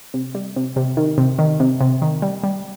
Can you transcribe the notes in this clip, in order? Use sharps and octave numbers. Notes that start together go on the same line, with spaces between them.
C3
G3
C3
C3
D#3
C3
D#3
C3
C3
D#3
G3
G3